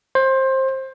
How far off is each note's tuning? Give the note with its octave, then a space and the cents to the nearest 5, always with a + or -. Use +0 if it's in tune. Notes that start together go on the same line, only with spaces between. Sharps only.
C5 +20